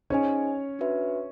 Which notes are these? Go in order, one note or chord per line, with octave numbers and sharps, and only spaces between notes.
C#4 D#4 G#4 C5 C#5 D#5 G#5
D4 F#4 B4 E5